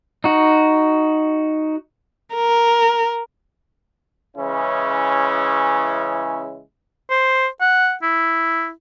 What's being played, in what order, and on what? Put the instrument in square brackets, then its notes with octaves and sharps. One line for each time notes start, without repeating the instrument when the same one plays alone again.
[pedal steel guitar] D#4 F#4
[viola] A#4
[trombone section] C#3 E3 G#3 C#4 E4
[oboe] C5
F#5
E4